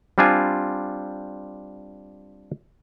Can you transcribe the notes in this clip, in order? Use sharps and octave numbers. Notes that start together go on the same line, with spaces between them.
G3 C4 D4 F4 G#5